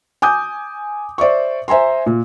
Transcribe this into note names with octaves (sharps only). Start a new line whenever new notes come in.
G#5 D6 D#6 G6
C5 D5 E5 C#6
C5 E5 G#5 A#5 C6
A#2